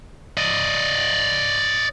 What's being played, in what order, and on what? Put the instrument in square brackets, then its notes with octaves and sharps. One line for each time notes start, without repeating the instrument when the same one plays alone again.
[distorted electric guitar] D5 D#5